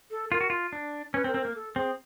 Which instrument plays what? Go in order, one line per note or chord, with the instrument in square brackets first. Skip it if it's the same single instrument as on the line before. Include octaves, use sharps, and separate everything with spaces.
[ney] A4
[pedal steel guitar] F4 [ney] A#4
[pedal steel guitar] F#4
F4
D4
[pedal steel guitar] C#4 [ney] B4
[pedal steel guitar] C4
[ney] A#4
[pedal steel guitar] C4
[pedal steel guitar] A#3 [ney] A#4
[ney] A4
[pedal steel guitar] C4 [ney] G#4